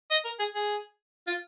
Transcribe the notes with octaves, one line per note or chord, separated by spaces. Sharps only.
D#5
A#4
G#4
G#4
F4